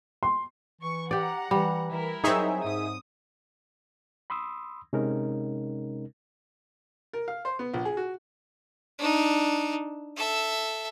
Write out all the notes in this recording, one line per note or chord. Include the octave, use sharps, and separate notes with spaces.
C6
E3 C#6
G4 D5 F#5 A#5
E3 G3
E3 E4 A#4
F#3 C4 D#4 G#4 C#5 E5
G#2 D#6
B5 C6 D#6 E6
C3 G#3 C#4 D#4 A#4
A#4
F5
C5
B3
A#1
G#4
F#4
D4 D#4
A4 E5